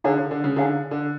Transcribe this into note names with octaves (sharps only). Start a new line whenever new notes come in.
D3 D#4 G#4 C#5 F5 G#5
D3
D3
C#3
D3 D#4 G#4 C#5 F5 G#5
D3